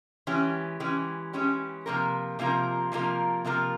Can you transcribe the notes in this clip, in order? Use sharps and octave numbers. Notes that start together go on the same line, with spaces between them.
E3 G#3 C#4 G4
E3 G#3 C#4 G4
E3 G#3 C#4 G4
C3 F3 A#3 F4 A#4
C3 F3 A#3 F4 A#4
C3 F3 A#3 F4 A#4
C3 F3 A#3 F4 A#4